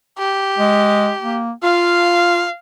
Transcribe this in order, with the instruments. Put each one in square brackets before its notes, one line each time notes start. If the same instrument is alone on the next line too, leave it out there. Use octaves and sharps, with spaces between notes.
[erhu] G4
[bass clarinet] G#3
A#3
[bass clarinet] F4 [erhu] F5